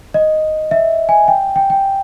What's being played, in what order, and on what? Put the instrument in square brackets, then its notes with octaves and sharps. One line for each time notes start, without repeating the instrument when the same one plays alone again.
[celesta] D#5
E5
G#5
G5
G5
G5